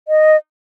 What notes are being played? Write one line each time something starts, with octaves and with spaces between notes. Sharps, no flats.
D#5